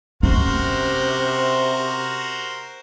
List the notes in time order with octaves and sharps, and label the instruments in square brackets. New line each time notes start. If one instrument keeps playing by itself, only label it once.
[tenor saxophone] C3 [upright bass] C#4 [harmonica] F#4 A#4 C5